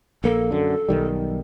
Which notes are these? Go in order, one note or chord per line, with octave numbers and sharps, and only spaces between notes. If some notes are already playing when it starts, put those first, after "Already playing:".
A#1 A#3 A4
F#2 D3
B1 D#3 G3